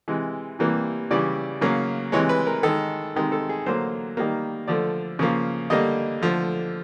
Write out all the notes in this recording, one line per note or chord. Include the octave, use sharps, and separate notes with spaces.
C3 E3 G#3
C3 E3 G3 A#3
C#3 E3 G3 D5
C#3 F#3 A#3
C3 E3 G#3 C#5
B4
A#4
D#3 G#3 A4
C3 D#3 G#3
A4
G#4
D3 F#3 A#3 C5
D#3 G3 A#3
D3 F3 A3 D5
C#3 F3 A#3
D3 G3 A#3 D#5
D3 F3 A3